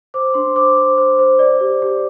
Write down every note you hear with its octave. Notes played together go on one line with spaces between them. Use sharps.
C5 D6
D4 C6
C5 D6
C5
C5
C5
D5
G4
G4